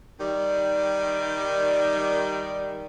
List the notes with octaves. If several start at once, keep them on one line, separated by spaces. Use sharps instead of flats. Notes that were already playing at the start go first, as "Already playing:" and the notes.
D#3 G3